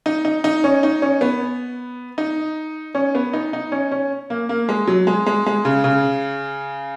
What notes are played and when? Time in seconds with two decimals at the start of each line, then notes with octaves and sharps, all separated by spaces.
0.06 D#4
0.25 D#4
0.44 D#4
0.64 C#4
0.83 D#4
1.02 C#4
1.21 B3
2.18 D#4
2.95 C#4
3.15 B3
3.33 D#4
3.53 D#4
3.72 C#4
3.92 C#4
4.30 A#3
4.49 A#3
4.69 G#3
4.87 F#3
5.07 G#3
5.26 G#3
5.46 G#3
5.65 C#3
5.84 C#3